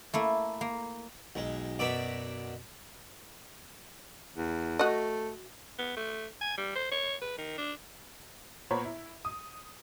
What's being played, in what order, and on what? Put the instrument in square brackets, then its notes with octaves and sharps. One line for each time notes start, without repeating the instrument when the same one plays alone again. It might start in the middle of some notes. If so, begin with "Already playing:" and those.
[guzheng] A3 A#3 E4
A#3
[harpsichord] B1 G#3
F#2 B2 D5 E5 B5
[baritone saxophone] E2
[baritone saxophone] A3 [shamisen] F#4 D#5
[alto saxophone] B3
A3
G#5
G3
C5
C#5
B4
D#3
D4
[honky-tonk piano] A#2 B3 C5 C#5 A#5 B5
E4
D#6